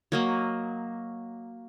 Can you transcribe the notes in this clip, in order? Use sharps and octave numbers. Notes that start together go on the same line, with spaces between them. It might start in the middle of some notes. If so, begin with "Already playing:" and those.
F#3 A#3 D#5